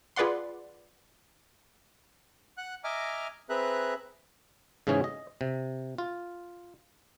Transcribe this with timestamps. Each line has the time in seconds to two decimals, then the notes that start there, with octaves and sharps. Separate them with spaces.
0.16 F4 G#4 B4 D5 F#5 C6
2.58 F#5 F#6
2.84 D#5 E5 G#5 A#5 D6 F6
3.50 C4 G#4 B4 E5 A#5 F#6
4.87 G#2 C#3 E3 C#4 G#4
5.04 D#5
5.41 C3
5.98 F4